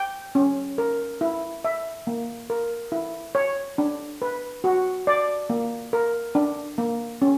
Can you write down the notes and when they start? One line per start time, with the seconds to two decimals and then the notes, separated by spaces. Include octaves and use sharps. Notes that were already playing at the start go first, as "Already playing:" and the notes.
Already playing: G5
0.35 C#4
0.78 A#4
1.21 E4
1.65 E5
2.07 A#3
2.50 A#4
2.92 E4
3.35 C#5
3.78 D4
4.22 B4
4.64 F#4
5.07 D5
5.50 A#3
5.93 A#4
6.35 D4
6.78 A#3
7.22 C#4